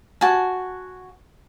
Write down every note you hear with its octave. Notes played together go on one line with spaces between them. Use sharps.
F#4 G#5 A5